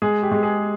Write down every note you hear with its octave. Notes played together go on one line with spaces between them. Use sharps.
G#3 G#4
G4
G#3
G#4